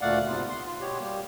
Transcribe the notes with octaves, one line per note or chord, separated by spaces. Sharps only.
D2 A#2 A3 D5 F5 F#5
G#2 C3 B3 F4
C6
F4
B2 B3 G4 C#5
G3 A#3 G4